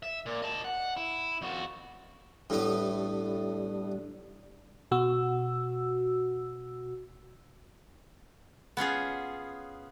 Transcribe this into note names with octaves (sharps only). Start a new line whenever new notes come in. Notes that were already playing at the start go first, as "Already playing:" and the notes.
E5
A#2
D#5 A5
F#5
E4
F2 F#4
A2 G3 B3 D4
B2 F#4 E6
B3 C#4 F4 G#4